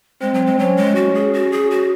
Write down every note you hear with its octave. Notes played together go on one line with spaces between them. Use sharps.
G#3 C4
F#3
G#3
F#3 C#4
G#3
F#4
G#4
F#4
G#4
F#4